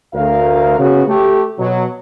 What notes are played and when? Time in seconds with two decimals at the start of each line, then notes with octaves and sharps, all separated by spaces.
0.13 D2 A#4 F5
0.79 C#3 B3 F#4
1.08 A3 G4
1.59 B2 F#3